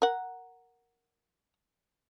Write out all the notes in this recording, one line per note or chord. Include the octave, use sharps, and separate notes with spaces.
A#4 F#5